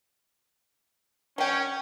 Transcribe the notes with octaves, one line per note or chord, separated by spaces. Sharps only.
F#3 C#4 G5